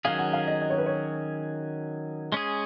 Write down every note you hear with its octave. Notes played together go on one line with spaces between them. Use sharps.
D#3 F#3 C#4 G#4 F5
F#5
F5
D#5
D#5
C#5
B4
C#5
G#3 C#4 G#4